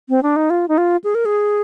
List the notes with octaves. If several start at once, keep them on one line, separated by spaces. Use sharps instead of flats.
C4
D4
D#4
F4
D#4
F4
G#4
A#4
G#4